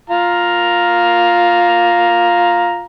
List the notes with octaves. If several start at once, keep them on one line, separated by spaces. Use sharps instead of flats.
F4 F5 A#5